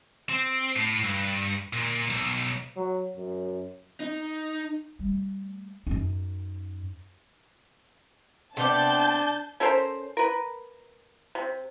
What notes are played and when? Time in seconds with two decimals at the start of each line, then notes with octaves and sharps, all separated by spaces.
0.29 C4
0.76 A2
1.04 G2
1.73 A#2
2.10 B1
2.77 F#3
3.17 F#2
4.00 D#4
4.99 G3 A3
5.87 F#2 D#4
8.57 C3 B3 D4 D5 A5 G6
9.60 C#4 A4 A#4 C5
10.17 A#4 B4
11.35 C3